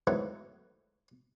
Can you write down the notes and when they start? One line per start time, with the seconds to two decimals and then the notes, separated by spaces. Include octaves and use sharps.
0.07 G#2 D#3 E3 F#3 A3 B3